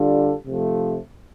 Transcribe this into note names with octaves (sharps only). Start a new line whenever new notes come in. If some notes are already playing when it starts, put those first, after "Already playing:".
Already playing: D3 G3 D4 F4 A4
C3 F3 A3